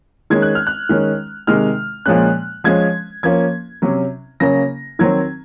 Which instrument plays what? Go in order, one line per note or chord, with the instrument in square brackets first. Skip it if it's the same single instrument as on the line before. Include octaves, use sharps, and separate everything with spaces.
[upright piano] D#3 G#3 C#4 G#6
F#6
F6
F#6
D#3 G#3 C#4
C3 D#3 G#3 F6
A#2 F3 G#3 C#4 F#6
F3 G#3 C#4 G#6
F3 A#3 C#4 G#6
C3 F#3 C#4
C#3 F#3 A#3 C#4 A#6
D#3 F#3 C4 G#6